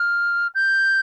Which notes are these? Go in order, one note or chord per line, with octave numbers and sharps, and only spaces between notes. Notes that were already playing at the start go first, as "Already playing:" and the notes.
Already playing: F6
G6